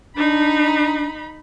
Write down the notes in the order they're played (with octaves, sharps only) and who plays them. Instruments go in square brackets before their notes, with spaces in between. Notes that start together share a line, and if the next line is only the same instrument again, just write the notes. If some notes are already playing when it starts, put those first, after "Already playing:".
[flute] D4 [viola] D#4 B5